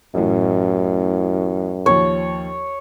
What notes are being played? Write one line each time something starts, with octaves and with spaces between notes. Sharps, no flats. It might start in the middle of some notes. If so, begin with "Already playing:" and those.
A1 F#2 A2
D#2 F3 C#5